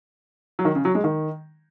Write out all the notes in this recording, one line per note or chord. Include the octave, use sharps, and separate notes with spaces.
F#3
D#3
C#3
F#3
G#3
D#3